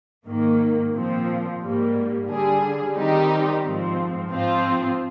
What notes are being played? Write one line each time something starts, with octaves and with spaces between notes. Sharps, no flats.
G#2 D#3 A#3
A#2 F3 C4
G#2 G3 A#3
D3 G3 D4 G#4
D#3 G3 C4 D#4 G4
G#2 F3 C4
G#2 F3 C4 F4